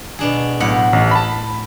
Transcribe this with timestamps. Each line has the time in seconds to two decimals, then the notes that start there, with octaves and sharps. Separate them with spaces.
0.19 B2 D4 G#4
0.60 B1 A2 C#5 F#5
0.93 A1
1.11 A5 B5